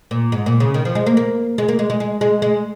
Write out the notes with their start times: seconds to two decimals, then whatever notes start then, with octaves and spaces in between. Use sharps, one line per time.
0.11 A#2
0.32 G#2
0.46 A#2
0.60 C#3
0.74 D#3
0.85 F3
0.95 G#3
1.06 A#3
1.17 A#3
1.58 G#3
1.68 A#3
1.79 G#3
1.90 G#3
2.00 G#3
2.21 G#3
2.42 G#3